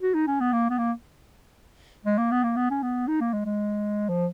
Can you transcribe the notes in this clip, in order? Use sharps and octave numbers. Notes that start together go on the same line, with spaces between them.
F#4
D#4
C#4
B3
A#3
B3
A#3
G#3
A#3
B3
A#3
B3
C#4
B3
D#4
A#3
G#3
G#3
F3